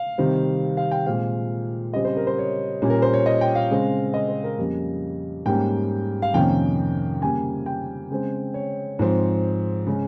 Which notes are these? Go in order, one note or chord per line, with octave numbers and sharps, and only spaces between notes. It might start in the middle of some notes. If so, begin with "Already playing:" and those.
Already playing: F5
C3 D#3 G3 C4
F5
G5
A#2 G#3 C4 F5
C#3 G3 C4 D#5
C5
A#4
C5
C#5
A#2 G3 A#3 C#4
A#4
C5
C#5
D#5
G5
F5
C#3 G#3 C4
D#5
C5
A#4
F2 C#3 G3 A#3
G#2 G3 A#3 C#4 G5
F5
F2 C3 D#3 A#3 C#4 G5
C#3 G3 A#3 G#5
G5
C#3 G#3 C4
C#5
G#2 F3 C4
C#3 G#3 C#4